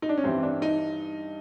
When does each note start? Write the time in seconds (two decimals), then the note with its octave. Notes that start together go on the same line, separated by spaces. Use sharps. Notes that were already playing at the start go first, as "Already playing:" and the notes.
0.02 D#4
0.09 D4
0.18 C#4
0.24 G2 E3 G3 C4
0.43 D4
0.62 D#4